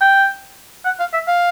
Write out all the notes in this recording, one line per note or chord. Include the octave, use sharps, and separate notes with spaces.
G5
F#5
F5
E5
F5